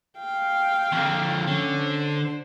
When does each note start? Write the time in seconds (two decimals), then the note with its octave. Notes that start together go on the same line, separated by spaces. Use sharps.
0.19 F5 G5
0.92 F2 D3
1.47 D3 C#4
1.82 C5